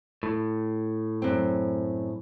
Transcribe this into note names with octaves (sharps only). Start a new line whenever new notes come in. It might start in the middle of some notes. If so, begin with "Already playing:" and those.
A2
F#2 C4